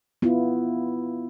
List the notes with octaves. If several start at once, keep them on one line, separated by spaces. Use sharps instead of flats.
B3 E4 F4